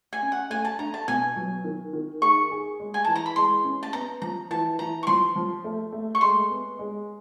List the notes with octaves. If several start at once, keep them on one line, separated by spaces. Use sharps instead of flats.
G#5
C#4
F#5
A3 G#5
A5
D4 A#5
A5
B2 G#5
F#3
D#3
D#3
G#4 C#6
G#4
G#3
G#5
E3 A5
A#5
B5
G#3 C6
C#4
A5
B3 A#5
F3 A#5
E3 A5
E3 A#5
C#6
F3 C6
F3
A3
A3
C#6
G#3 C6
B3
G#3